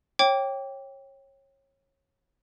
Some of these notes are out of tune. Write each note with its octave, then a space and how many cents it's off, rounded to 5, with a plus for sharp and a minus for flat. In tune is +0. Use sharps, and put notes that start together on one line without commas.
C#5 -25 G5 +0 D6 -20